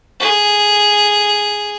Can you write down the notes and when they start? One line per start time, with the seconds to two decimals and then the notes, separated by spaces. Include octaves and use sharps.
0.20 G#4